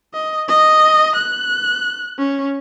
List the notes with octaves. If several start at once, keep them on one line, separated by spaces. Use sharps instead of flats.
D#5
D#5
F#6
C#4